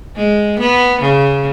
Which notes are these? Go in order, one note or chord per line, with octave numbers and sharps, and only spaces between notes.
G#3
B3
C#3